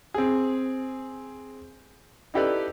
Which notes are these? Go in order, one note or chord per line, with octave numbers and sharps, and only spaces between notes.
C4 G#4
D#4 E4 G4 A4 B4 D5